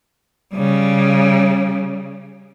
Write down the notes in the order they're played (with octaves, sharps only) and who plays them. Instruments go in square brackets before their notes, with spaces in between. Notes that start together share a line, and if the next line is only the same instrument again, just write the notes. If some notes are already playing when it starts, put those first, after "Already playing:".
[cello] C#3 G3